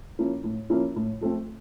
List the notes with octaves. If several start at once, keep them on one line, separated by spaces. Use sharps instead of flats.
F3 A#3 C#4 E4
A2
F3 A#3 C#4 E4
A2
F3 A3 C4